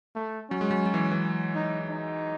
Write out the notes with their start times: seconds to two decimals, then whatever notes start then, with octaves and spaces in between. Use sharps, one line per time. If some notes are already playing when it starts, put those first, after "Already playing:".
0.15 A3
0.50 F#3 C#4
0.61 G#3
0.71 F#3
0.86 F#3
0.94 E3
1.12 E3
1.55 D#4
1.89 D#4